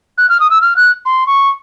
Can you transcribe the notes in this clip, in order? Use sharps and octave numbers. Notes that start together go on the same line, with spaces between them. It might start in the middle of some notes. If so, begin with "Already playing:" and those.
F#6
F6
D#6
E6
F6
F#6
C6
C#6